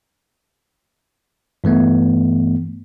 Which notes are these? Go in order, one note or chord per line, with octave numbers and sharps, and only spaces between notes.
G2 E3 A3 B3